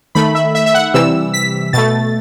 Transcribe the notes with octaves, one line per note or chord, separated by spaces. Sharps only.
D#3 A3 B5
E5
E5
E5
F#5
C3 E3 G3 E6
B6
B2 A3 A6